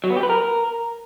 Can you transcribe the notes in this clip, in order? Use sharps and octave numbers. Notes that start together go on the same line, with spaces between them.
F#3
B3
G4
B4
A#4